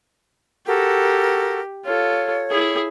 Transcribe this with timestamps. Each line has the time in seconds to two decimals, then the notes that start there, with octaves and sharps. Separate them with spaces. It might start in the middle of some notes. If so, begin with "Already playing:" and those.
0.66 F#4 G4 A4 A#4
1.85 F4 A4 C#5
2.51 E4 G#4